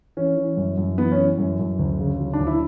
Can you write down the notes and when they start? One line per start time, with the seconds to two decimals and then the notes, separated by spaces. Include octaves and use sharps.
0.17 E3 C#4
0.37 E3
0.57 F#2
0.77 F#2
0.98 E3 B3
1.12 C#4
1.19 E3
1.38 F#2
1.59 F#2
1.79 D2
1.99 C#3
2.20 F#3
2.34 D4
2.40 D2
2.47 E4